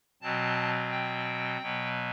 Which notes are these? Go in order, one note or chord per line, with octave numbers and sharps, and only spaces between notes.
B2 F#3 C4 A5
G5
B2 F#3 B3